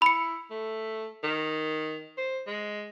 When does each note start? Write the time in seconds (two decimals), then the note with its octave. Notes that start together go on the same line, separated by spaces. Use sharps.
0.02 E4 B5 C#7
0.50 A3
1.23 D#3
2.17 C5
2.47 G#3